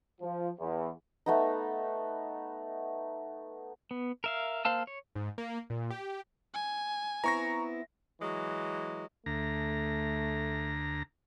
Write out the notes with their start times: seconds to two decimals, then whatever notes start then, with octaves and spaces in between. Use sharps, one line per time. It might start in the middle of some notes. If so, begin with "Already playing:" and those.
0.21 F3
0.59 E2
1.26 A3 B3 D#4
3.91 B3
4.24 A#4 E5 F5
4.65 A#3 C5 F5 A5 E6
4.87 C#5
5.15 G#2
5.38 A#3
5.70 A#2
5.90 G4
6.54 G#5
7.24 B3 C4 E4 A#5 C#6 A#6
8.21 E3 F#3 G#3
9.26 D2 A3 A#5